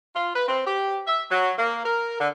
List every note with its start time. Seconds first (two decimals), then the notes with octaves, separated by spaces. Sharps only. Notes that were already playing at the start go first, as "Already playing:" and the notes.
0.16 F4
0.35 B4
0.48 C4
0.67 G4
1.07 E5
1.31 F#3
1.58 A#3
1.86 A#4
2.20 D3